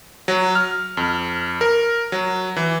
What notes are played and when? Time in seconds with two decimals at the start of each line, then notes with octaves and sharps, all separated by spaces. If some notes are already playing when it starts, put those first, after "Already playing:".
0.28 F#3
0.55 F6
0.97 F2
1.61 A#4
2.12 F#3
2.56 E3